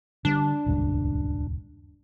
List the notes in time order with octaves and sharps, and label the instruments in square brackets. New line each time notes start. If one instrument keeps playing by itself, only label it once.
[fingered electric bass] D3 G3 [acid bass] D4
[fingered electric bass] D#1 C#2 G2